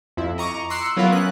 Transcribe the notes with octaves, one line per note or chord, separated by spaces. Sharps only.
F2 E4
D#5 A#5 C#6 D6
C6 D6 E6 F#6 C7 C#7
F#3 B3 E4 F4 A#4 B4
C#4 F#6